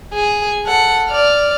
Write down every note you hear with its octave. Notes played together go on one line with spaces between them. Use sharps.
G#4
A4 F#5
D5 F6